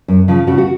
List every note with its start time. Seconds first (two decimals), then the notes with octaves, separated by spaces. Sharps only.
0.08 F#2
0.28 C#3 F3
0.47 C#3 F#4
0.58 F#4